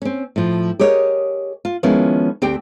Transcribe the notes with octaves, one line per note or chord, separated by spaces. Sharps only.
C4 C#4
A2 F3
G4 G#4 A#4 C#5 D#5
F4
D#3 F3 G#3 B3 C#4 E4
D2 C4 G4 G5